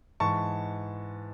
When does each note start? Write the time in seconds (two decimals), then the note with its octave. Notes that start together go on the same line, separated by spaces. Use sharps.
0.20 G#2 E3 A5 C#6